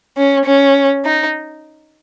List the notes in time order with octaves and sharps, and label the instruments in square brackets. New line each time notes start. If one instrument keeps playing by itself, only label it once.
[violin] C#4
C#4
D#4